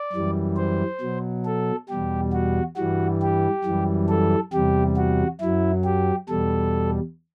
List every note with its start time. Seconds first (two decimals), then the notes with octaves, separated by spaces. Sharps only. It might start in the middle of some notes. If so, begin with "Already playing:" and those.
Already playing: D5
0.13 F#2 E3 G3
0.57 C5
1.01 B2 F#3
1.45 A4
1.89 E2 B2 G3 G4
2.33 F#4
2.77 G2 E3 G3 F#4
3.22 G4
3.64 F#2 E3 G3
4.09 A4
4.52 E2 C3 G3 G4
4.97 F#4
5.40 F#2 F#3 E4
5.84 G4
6.28 E2 B2 G3 A4